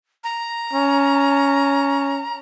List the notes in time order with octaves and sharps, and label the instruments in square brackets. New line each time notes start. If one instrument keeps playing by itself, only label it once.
[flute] A#5
[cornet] C#4